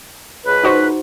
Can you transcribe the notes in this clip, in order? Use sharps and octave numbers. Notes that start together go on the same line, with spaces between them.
C#2 B4
D#4 F#4 C5